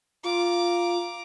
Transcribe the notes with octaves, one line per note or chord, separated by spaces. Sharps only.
F4 A#5 D6